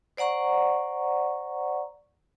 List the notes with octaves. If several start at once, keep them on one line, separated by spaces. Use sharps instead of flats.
C5 D5 F#5 A#5 C#6